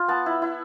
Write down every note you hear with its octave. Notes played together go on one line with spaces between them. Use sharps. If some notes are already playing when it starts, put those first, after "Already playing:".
Already playing: F4
B3 A5
E4
E4